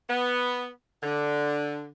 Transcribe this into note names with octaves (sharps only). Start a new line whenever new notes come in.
B3
D3